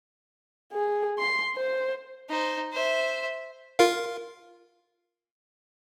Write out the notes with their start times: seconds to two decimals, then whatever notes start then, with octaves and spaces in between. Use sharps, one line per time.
0.73 G#4
1.19 C6
1.56 C5
2.29 D#4 C5
2.72 C5 E5
3.79 F4 A#4 F5